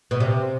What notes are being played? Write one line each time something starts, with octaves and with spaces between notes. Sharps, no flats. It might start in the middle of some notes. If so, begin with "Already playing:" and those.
B2
C3